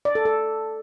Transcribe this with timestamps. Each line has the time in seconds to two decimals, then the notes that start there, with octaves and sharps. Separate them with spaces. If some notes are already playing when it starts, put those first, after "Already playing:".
0.05 D5
0.15 A4
0.25 A4